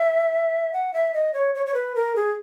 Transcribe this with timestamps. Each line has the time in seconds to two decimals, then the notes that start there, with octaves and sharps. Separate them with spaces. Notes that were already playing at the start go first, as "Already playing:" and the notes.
Already playing: E5
0.73 F#5
0.94 E5
1.14 D#5
1.34 C#5
1.55 C#5
1.66 C#5
1.74 B4
1.96 A#4
2.16 G#4